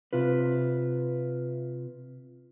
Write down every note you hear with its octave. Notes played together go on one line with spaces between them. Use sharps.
C3 F4 B4